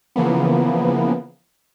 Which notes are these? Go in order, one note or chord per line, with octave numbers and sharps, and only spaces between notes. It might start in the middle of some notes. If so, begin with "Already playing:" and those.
C#3 E3 F3 A#3 B3